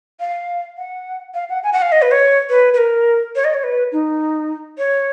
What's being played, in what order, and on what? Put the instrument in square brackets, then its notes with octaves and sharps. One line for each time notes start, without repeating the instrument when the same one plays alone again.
[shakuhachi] F5
F#5
F5
F#5
G#5
F#5
F5
D#5
B4
C#5
B4
B4
A#4
C#5
D#5
C#5
B4
D#4
C#5